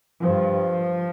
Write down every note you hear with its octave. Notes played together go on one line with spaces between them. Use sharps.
G2 F3